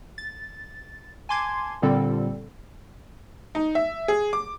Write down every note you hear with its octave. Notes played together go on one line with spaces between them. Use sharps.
A6
G#5 A5 C6 D6 G#6 C7
A#2 D3 G3 C4 A4
D#4
E5
G#4
D6